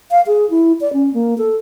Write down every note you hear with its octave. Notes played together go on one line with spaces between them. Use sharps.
F5
G#4
E4
D5
C#4
A#3
A4